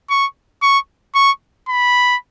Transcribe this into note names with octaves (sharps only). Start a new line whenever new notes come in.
C#6
C#6
C#6
B5